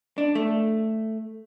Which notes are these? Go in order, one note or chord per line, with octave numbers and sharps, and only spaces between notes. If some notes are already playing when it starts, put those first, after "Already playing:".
D4
A3